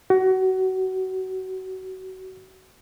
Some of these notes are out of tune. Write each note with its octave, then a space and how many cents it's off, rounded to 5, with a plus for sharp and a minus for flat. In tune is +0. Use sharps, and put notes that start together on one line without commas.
F#4 +25